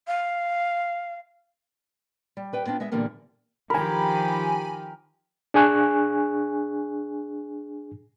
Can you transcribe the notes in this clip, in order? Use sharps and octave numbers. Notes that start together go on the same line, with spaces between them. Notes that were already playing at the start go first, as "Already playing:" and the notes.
F5
G3
G3 B4 G5
B3 C4 D4 F4
G#3 B3 E5
A#2 D3 E3 G3 A#3 B3
D#3 F3 G4 A#4 G5 G#5 B5
D4 G#4 G#5 C#6 F#6